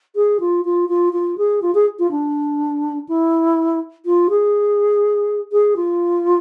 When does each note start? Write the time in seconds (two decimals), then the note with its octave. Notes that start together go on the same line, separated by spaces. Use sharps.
0.15 G#4
0.40 F4
0.64 F4
0.88 F4
1.12 F4
1.37 G#4
1.61 F4
1.74 G#4
1.99 F4
2.10 D4
3.08 E4
4.05 F4
4.29 G#4
5.52 G#4
5.76 F4